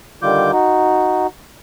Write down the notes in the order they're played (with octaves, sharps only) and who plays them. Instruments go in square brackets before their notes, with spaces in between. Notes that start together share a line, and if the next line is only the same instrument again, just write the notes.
[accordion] D3 D#3 G3 F4 D6 G6
D#4 F#4